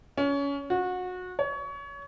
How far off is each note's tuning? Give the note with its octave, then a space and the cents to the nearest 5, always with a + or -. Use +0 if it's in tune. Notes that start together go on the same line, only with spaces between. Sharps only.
C#4 +25
F#4 -25
C#5 +25